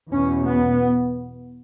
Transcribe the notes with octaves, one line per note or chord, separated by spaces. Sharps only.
E2 B2 C#4
B3